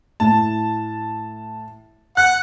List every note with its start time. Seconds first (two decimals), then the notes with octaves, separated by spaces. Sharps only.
0.20 A2 A5
2.17 F#5 F#6